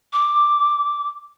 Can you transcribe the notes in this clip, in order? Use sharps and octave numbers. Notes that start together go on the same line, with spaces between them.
D6